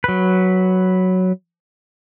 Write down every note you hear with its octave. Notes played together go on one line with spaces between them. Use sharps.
F#3 B4